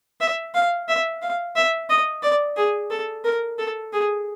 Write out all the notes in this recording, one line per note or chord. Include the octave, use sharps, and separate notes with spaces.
E5
F5
E5
F5
E5
D#5
D5
G#4
A4
A#4
A4
G#4